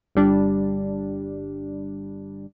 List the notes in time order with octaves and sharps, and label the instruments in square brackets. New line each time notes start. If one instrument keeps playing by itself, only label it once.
[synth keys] G1 G3 D4